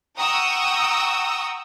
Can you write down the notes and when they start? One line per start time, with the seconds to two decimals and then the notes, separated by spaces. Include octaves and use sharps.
0.16 F#5 G5 A#5 C#6 D#6 E6